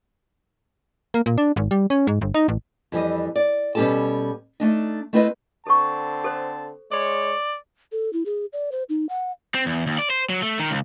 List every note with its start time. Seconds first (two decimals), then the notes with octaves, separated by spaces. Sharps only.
1.14 A#3
1.26 A#2
1.38 D4
1.56 G#1
1.71 G3
1.90 C#4
2.07 G#2
2.21 G1
2.34 D#4
2.48 A1
2.92 F2 E3 G3 D#5
3.36 D5
3.75 B2 G3 C#4 G4 A4 A5
4.60 A3 D4 D#4
5.13 A3 C4 E4 B4 D5 D#5
5.67 D3 C4 A4 A5 C#6
6.24 A4 C5
6.92 G#3 C#5 D5
7.92 A4
8.13 E4
8.26 G#4
8.53 D5
8.72 C5
8.89 D#4
9.09 F#5
9.55 C4
9.66 E2
9.87 D#2
9.98 D5
10.10 C5
10.30 F#3
10.43 A3
10.59 D#3
10.71 C#2